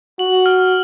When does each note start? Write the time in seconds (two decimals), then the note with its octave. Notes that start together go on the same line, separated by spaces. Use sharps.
0.19 F#4 F#7
0.46 F6